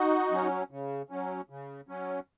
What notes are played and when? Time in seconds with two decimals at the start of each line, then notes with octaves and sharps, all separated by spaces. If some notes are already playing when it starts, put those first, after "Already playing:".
Already playing: D#4 F#4
0.31 F#3 C#4
0.71 C#3
1.10 F#3 C#4
1.50 C#3
1.89 F#3 C#4